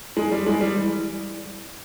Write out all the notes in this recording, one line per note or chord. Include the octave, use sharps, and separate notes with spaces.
G#3
G3
G#3
G3
E3